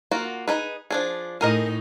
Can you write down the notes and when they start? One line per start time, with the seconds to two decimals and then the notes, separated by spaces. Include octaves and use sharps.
0.11 A#3 F4 F#4
0.48 D#4 G#4 B4
0.91 F3 D4 G#4
1.41 A2 D#4 G#4 A#4 D#5